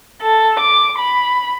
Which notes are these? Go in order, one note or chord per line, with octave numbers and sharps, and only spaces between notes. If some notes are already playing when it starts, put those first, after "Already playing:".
A4
D6
B5